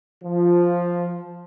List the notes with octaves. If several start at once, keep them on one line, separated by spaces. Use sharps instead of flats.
F3